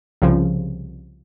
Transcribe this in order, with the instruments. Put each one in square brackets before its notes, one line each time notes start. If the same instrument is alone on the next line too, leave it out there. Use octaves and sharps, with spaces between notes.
[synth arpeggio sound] C2 C#3 F3